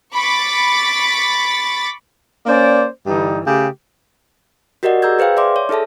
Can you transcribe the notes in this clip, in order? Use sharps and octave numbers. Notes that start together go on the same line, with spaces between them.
B5 C#6 D6 A6 B6
A#3 C#4 C5 D5
G2 D3 E3 G3 D#4
C#3 A3 G4
F#4 G4 A#4 D5 D#5 F#5
G#4 A#5 E6 G6 G#6
G#4 B4 C5 F5 G5
D5 E5 C6 D6
C#5
D#4 G#4 A4 E5 A5